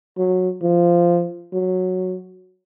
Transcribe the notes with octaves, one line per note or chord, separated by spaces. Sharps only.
F#3
F3
F#3